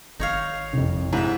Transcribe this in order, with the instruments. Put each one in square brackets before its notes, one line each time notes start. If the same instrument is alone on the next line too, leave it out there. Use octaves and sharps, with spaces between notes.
[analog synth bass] G#1 [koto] D#4 C#5 F5
[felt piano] C2 F2
[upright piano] G#2 [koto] C3 E5 [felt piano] E4